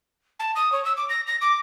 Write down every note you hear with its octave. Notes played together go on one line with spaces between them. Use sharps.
A5
D#6
C#5
E6
D6
A#6
A#6
D6